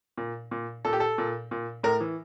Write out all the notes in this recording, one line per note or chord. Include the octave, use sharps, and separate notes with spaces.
A#2
A#2
A#2 A4
G4
A4
A#2
A#2
A2 A#4
E3